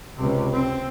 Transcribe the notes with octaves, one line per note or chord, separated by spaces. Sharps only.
C#2 C3
C4